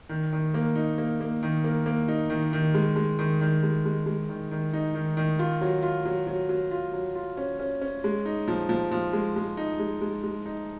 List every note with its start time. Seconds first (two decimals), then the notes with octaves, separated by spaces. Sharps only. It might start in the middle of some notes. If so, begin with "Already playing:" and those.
0.09 D#3
0.32 D#3
0.54 A#3
0.75 D#4
0.98 A#3
1.21 A#3
1.43 D#3
1.64 A#3
1.86 A#3
2.08 D#4
2.30 D#3
2.53 D#3
2.74 G#3
2.96 G#3
3.19 D#3
3.41 D#3
3.63 G#3
3.85 G#3
4.06 G#3
4.29 D#3
4.51 D#3
4.73 D#4
4.95 D#3
5.17 D#3
5.39 F4
5.61 F#3
5.82 F4
6.06 F#3
6.27 F#3
6.49 F#3
6.71 F4
6.93 F#3
7.15 F4
7.37 C#4
7.59 C#4
7.81 C#4
8.04 G#3
8.26 D#4
8.48 F3
8.69 F3
8.91 F3
9.13 G#3
9.36 G#3
9.57 D#4
9.79 G#3
10.01 G#3
10.23 G#3
10.46 D#4